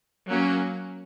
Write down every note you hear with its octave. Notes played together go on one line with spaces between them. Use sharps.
F#3 A#3 C#4